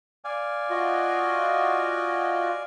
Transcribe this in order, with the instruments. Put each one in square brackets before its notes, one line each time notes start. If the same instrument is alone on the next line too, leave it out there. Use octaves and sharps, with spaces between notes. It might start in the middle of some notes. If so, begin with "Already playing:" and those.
[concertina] D5 F5 G#5
[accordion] F4 F#4 D#5